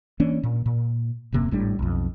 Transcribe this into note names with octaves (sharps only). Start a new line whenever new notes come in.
E3 A#3 C#4 D4
A#2
A#2
D#1 F#2 C3 A#3
G#1 A2 G3 D4
B1 F2